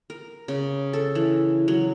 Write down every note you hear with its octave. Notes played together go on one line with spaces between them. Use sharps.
A#4
C#3
A4
E3
F#3